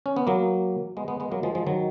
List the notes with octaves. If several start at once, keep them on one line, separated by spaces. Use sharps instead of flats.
C#4
B3
F#3 A#3
G#3 B3
G#3 B3
G#3 B3
F#3 A#3
F3 G#3
F3 G#3
D#3 F#3